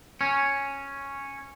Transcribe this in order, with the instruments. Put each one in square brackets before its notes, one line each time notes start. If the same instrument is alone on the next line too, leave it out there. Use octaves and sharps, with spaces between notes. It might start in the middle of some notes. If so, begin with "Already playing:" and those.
[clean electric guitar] C#4